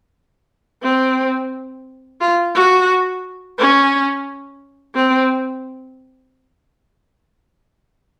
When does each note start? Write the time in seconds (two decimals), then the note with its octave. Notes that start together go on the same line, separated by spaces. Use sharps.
0.83 C4
2.21 F4
2.55 F#4
3.58 C#4
4.95 C4